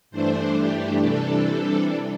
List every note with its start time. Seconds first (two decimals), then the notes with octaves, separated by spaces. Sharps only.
0.11 G2 E3 A3 D4 C5
0.56 G4
1.00 C3 E3 G3 D4 A4